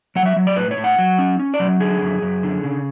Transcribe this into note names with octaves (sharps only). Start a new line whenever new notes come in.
F#3 F#5
E5
F#3
D5
A2 B4
C#5
A2
F#5
F#3
C#4
C#4
D5
F#3
D3 G#4
F#2
F#2
D3
C#3